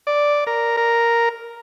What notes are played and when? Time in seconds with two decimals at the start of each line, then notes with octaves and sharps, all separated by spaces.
0.07 D5
0.47 A#4
0.77 A#4